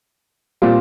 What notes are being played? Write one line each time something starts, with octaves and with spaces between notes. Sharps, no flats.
A#2 G3 C4 F4